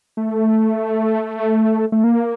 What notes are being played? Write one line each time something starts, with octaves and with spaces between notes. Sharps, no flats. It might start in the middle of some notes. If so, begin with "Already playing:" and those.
A3
A3
A#3